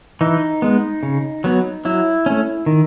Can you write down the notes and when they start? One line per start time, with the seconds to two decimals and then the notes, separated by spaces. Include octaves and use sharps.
0.21 E3 D#4
0.62 G#3 B3
1.03 C#3
1.44 F#3 B3
1.85 F#3 E4
2.26 A3 C#4
2.66 D#3